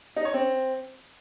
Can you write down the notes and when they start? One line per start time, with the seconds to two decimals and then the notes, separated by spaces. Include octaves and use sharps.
0.16 D#4
0.25 C#5
0.34 C4